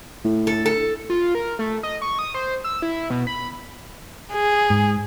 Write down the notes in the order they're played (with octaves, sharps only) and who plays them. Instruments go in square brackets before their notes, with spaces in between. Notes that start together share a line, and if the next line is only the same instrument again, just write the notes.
[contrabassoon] A2
[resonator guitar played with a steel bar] A4
A4
[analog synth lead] F4
A#4
A3
D#5
C#6
D#6
C5
E6
E4
B2
B5
[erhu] G#4
[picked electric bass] G#2